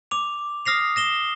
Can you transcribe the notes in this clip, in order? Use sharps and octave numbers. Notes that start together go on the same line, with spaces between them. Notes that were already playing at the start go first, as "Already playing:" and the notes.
D6 F7
D#6 F6 A#6 C7 F7
A#6 E7 G7